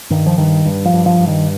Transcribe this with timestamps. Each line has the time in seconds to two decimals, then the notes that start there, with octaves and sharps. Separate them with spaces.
0.10 G2 D#3
0.26 F3
0.38 G2 D#3
0.65 G2
0.85 F3
0.93 G2
1.06 F3
1.20 G2
1.27 D#3